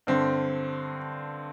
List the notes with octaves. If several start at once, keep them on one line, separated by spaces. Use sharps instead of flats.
G2 D3 C4